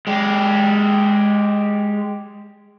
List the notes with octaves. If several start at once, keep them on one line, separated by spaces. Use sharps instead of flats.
G#3 G4